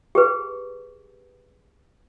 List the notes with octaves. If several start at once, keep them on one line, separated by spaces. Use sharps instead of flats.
G4 G#4 B4